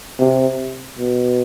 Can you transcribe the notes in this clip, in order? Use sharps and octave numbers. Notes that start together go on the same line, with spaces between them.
C3
B2